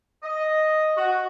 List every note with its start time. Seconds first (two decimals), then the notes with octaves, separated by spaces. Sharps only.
0.23 D#5
0.97 F#4